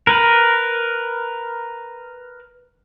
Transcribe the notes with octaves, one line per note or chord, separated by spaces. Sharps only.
A#4 B4